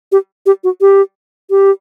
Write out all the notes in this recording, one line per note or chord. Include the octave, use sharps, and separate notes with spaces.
G4
G4
F#4
G4
G4